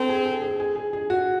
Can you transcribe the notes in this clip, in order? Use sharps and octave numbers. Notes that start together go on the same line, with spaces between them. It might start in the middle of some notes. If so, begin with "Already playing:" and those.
Already playing: C4 A4
G#4
A4
G#4
G#4
G#4
G#4
F#4